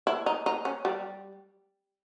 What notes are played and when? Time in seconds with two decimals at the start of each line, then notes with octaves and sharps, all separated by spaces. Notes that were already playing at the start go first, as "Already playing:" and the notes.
0.07 E4
0.26 D#4
0.46 D#4
0.65 C#4
0.85 G3